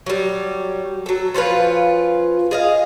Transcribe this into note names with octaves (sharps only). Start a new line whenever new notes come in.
F#3 G3
F#3 A4
F3 C#4 F4 B4
G#4 D#5 F5